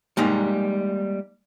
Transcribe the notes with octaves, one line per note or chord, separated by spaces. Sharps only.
G3 G#3 A#3 D#4